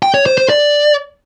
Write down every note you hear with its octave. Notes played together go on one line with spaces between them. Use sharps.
G5
C#5
C5
C5
D5